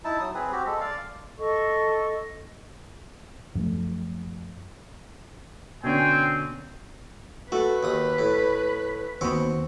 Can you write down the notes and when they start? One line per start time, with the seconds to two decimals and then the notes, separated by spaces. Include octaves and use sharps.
0.04 D#4 E4 A5
0.20 F#3 D#6
0.34 C4 G#4 B4
0.52 C4 F#4 G4
0.66 G#3 A4
0.81 D5 F5
1.39 A4 D#5 C#6
3.55 F#2 F3 A3
5.84 B2 D3 C4 C#4 G5 G#5
7.52 A3 F#4 B4
7.83 D#2 D#6
8.19 A2
9.21 D#2 B3 C4 F#4